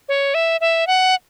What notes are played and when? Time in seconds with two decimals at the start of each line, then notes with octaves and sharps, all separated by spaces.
0.09 C#5
0.34 E5
0.61 E5
0.87 F#5